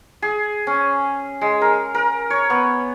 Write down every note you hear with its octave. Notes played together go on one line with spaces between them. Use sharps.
G#4
C#4
G#3
A#4
A#4
C#5
B3